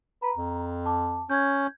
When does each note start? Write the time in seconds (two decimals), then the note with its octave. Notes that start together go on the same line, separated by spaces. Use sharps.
0.22 B4 A#5
0.36 F2
0.86 A5 D6
1.30 C#4 G6 G#6